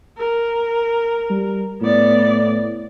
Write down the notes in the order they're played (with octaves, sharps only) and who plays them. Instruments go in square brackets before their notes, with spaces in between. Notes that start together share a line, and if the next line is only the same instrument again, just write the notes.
[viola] A#4
[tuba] G3
[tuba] A2 [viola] B3 D5